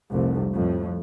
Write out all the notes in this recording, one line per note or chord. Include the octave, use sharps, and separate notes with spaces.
F1 C2
F2 A2